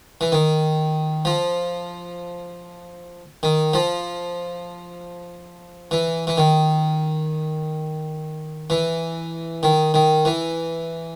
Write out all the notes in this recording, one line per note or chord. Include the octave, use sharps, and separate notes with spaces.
E3
D#3
F3
D#3
F3
E3
E3
D#3
E3
D#3
D#3
E3